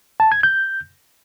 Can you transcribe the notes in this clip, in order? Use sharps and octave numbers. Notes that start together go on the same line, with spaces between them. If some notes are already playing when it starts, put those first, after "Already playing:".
A5
G#6
G6